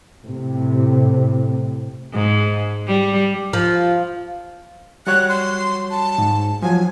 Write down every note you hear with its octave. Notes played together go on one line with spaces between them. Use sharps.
A2 C3
G#2
G3
F3
G3 F#4 C#5 F#6
C6
A5
G#2
F3 F#3 G#5